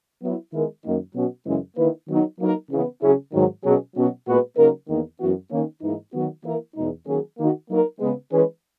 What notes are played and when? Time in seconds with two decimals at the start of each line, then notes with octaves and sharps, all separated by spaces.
0.21 F#3 B3 E4
0.52 D#3 G#3 B3 E4 A#4
0.84 F#2 D#3 A#3 D#4
1.14 B2 F#3 C#4 F#4
1.45 F#2 C#3 E3 G#3
1.76 D#3 A#3 E4 B4
2.08 D#3 F#3 B3 D#4
2.39 F#3 A#3 D#4 A#4
2.70 C#3 E3 B3
3.01 C#3 F#3 C#4 E4 G#4
3.33 G#2 D#3 F#3
3.63 B2 F#3 C#4 G#4
3.95 B2 F#3 C#4 F#4
4.26 A#2 G#3 B3 F#4 B4
4.57 C#3 F#3 A#3 D#4 A#4
4.89 E2 D#3 A#3 D#4
5.20 F#2 E3 B3 F#4
5.51 D#3 A#3 C#4
5.82 G#2 E3 A#3 D#4
6.14 D#3 F#3 B3 F#4
6.44 E3 A#3 E4 A#4
6.75 E2 B2 G#3 D#4
7.06 D#3 F#3 A#3 C#4 G#4
7.38 D#3 A#3 D#4 F#4
7.69 F#3 A#3 D#4 A#4
8.00 C#3 G#3 B3
8.31 E3 G#3 C#4 G#4 B4